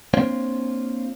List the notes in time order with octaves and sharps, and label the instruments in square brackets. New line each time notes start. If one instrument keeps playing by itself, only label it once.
[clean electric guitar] A#3 C4 D4 F4 C5 C#5